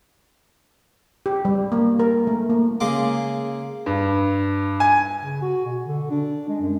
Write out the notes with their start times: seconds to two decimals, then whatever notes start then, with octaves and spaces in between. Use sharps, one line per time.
1.26 G4
1.45 G3
1.72 A#3
1.99 A#4
2.27 A3
2.50 A#3
2.80 C#3 G#3 A#3 D6
3.86 G2
4.80 G#5
5.22 C#3
5.42 F#4
5.66 B2
5.85 D3
6.11 D4
6.49 G#3
6.61 F#2